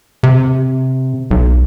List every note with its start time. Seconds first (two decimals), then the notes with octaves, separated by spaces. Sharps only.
0.23 C3
1.31 B1